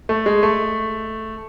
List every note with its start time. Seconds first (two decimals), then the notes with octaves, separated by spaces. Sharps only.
0.09 A3
0.26 G#3
0.43 A3